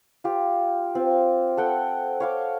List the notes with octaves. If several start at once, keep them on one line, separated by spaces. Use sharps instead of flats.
F4 G4
C4 F4
A4 F#5 G5
C#5 F5 D6